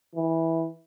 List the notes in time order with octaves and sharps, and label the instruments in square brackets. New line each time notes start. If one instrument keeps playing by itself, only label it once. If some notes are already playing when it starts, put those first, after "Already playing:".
[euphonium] E3